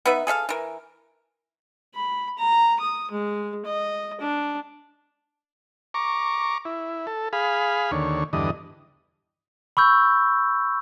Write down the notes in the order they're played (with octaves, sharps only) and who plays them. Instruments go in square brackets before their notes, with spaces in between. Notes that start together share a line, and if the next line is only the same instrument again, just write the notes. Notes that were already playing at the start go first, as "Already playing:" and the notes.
[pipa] B3 D#4 B4 E5
G#4 A4 E5 F5
E3 A#4
[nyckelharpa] B5
A#5
D#6
G#3
D#5
D4
[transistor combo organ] A#5 C#6 D6
E4
A4
G#4 F5 B5
D#2 D3 C#5
E2 G2 D3 D#5
[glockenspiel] B5 C#6 E6 G6